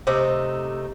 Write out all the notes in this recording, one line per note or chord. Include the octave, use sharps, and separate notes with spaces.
C3 A3 D#4